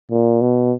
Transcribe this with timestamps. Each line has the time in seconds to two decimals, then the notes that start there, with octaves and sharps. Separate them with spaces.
0.11 A#2
0.41 B2